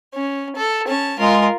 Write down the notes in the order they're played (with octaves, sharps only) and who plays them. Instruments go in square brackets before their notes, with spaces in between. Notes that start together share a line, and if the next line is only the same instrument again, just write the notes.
[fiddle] C#4
A4
C#4 A5
[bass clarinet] G#3 [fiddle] F4 A#4